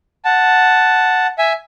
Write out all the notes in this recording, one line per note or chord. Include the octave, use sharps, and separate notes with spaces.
F#5 A5
E5 G#5